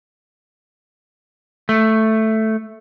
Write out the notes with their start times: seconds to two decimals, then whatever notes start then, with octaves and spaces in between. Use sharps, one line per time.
1.69 A3